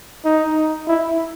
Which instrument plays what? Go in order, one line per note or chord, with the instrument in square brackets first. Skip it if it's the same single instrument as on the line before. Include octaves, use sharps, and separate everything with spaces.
[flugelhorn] D#4
E4